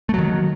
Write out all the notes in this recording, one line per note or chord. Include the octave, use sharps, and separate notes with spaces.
D#3 F#3 A3